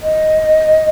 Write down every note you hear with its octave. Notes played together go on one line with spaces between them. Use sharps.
D#5